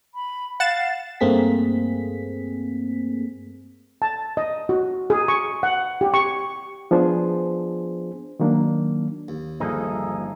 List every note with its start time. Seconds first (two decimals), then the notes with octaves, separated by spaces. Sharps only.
0.15 B5
0.60 F5 F#5 A6 E7
1.20 G2 A3 A#3 C4 G#4 B6
4.02 A5
4.37 D#5
4.69 F#4
5.10 G#4
5.28 C#6
5.63 F#5
6.01 G4
6.14 C#6
6.91 F3 B3 D4 F4 G#4 C5
8.40 D#3 F#3 A#3 D4
9.28 D#2
9.60 G1 F3 A#3 D#4 G#4 A4 E5